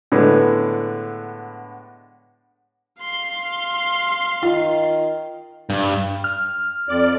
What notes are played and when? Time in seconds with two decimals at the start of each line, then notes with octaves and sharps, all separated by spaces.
0.12 A2 D3 G#3 B3
3.01 F5 C6 C7
4.43 D#3 F4
5.70 G2
6.24 F6
6.89 F2 D5